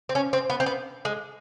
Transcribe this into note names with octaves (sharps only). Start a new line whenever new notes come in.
C4
C#4
C4
B3
C4
B3
G#3